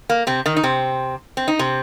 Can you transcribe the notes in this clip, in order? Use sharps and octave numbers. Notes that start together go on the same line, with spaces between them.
A#3
C3 C4
D#3 D#4
D#4
C3 C4
C4
D#4
C3 C4